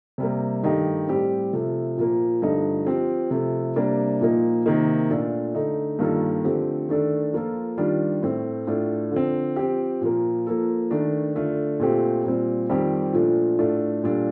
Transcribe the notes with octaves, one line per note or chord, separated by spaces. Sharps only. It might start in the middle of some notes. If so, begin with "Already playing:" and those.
C3 G3 A#3
G2 D#3 A3 D#4 G4
A2 G3 C4 G4
C3 F3 A3
A#2 F3 A#3
G2 D3 F3 A3 D#4
F3 C4 G4
C3 F3 A3
C3 G3 A#3 D4
A#2 F3 A#3 D#4
C3 D#3 A#3 D#4
A#2 A3 D4 F4 A4
D3 A3 D#4
G2 D#3 A#3 F4 A4
D3 F3 A3 C4 G4
D#3 A3 D4 A4
F3 A#3 F4 A4
D#3 G3 D4 F4
A2 A3 C4
A2 A3 D4 F4
D3 F3 C4
F3 C4 G4
A#2 F3 A#3
F3 A#3 F4 A4
D#3 A3 D4
D3 A3 D4 F4
A#2 A3 C4 G4
A#2 G3 C4
F2 D#3 G3 C4 G4
A#2 F3 A3 D4
A2 A3 D4 F4 A4
A#2 G3 D4 F4 A4